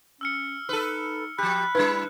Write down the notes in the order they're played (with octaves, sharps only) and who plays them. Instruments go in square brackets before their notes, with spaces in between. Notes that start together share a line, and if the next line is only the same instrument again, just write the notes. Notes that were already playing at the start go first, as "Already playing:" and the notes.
[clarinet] C#4 [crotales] E6 F6 C#7
[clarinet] D#4 [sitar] A4 B4
[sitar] F3 G4 [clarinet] B5 [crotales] F#6
[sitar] G3 D4 E4 [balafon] B4